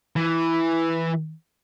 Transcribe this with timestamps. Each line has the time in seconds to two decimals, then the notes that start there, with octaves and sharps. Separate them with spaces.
0.16 E3